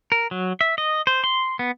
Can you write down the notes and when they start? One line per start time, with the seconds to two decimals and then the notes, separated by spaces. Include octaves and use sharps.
0.12 A#4
0.31 F#3
0.61 E5
0.78 D#5
1.07 C5
1.24 C6
1.59 B3